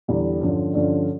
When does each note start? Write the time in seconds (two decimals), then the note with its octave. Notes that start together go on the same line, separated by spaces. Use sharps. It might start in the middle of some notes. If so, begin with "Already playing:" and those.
0.08 E2 D3 G3
0.41 G2 D3 F3 C#4
0.74 G2 D3 F3 C#4